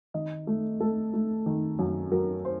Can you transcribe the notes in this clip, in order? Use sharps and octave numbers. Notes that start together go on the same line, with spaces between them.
D#3 D#5
A3
A3 A4
A3
D#3
F#2
F#3 A#4
C5